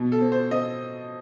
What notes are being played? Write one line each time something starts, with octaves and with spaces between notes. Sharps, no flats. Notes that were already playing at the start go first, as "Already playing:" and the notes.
Already playing: B2 B3
A4
C4
C5
C4 D#5